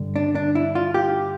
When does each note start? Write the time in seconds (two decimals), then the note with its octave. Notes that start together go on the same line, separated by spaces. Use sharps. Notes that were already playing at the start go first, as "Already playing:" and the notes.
Already playing: G2 D3
0.16 D4
0.35 D4
0.55 E4
0.75 F4
0.94 G4